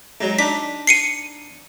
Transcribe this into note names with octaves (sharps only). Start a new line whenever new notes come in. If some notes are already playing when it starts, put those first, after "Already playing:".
G#2 F#3
D4 D#4 B6
C7 C#7 D#7